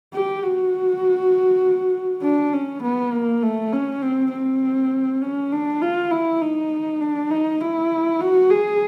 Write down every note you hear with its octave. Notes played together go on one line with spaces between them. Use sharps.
G4
F#4
D4
C#4
B3
A#3
A3
C#4
C4
C4
C#4
D4
F4
E4
D#4
D4
D#4
E4
F#4
G#4